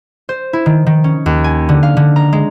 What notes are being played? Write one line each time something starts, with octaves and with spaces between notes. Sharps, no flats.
C5
E4
D#3
D#3
C#4
D#2
G#5
D3
F5
D3
A#5
G#3